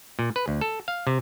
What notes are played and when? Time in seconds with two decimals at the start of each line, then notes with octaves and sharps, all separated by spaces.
0.19 A#2
0.36 B4
0.48 D2
0.61 A4
0.88 F5
1.07 C3